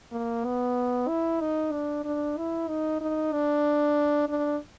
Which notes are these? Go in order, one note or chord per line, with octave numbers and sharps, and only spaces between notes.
A#3
B3
E4
D#4
D4
D4
E4
D#4
D#4
D4
D4